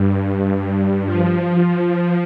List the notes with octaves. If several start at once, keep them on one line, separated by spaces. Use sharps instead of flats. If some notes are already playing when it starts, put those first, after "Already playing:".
Already playing: G2
F3